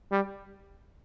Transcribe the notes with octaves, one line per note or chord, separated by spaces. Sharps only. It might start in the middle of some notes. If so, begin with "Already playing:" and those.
G3